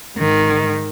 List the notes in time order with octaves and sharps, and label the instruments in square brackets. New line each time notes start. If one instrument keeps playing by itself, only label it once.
[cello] G#2 D#3